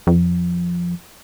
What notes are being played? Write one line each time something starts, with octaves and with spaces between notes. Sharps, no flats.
F2